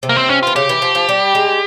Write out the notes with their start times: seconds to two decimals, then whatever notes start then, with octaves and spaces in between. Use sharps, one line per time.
0.03 C3
0.09 A#3
0.17 C4
0.29 C#4
0.43 F4
0.47 E3
0.56 C#3 G4
0.69 E3
0.82 F3
0.95 F3
1.09 G3
1.35 G#3